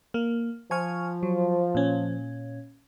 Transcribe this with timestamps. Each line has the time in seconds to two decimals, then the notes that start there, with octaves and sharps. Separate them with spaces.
0.14 A#3
0.71 F3 G#5 C#6 F6
1.23 F#3
1.75 A#2 C#4